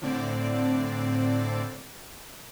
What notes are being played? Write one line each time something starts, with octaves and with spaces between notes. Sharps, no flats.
A2 D3 C4 D5